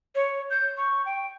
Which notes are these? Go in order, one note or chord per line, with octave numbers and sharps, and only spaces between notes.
C#5
G6
C#6
G5